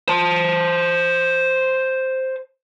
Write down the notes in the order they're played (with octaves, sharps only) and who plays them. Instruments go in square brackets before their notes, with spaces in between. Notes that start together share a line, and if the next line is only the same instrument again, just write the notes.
[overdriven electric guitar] C5 A5